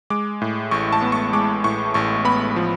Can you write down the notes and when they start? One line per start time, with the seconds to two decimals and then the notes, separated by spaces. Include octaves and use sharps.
0.10 G#3 D6
0.42 A2
0.71 A1 C#6
0.92 A5
1.02 B3
1.12 C#6
1.33 G#3 D6
1.64 A2 C#6
1.94 A1 C#6
2.25 B3 B5
2.56 F3